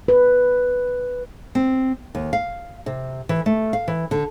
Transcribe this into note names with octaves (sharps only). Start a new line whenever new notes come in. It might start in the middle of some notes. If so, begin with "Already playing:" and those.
B4
C4
D#2
F5
C3
E3
A3
F5
E3
D3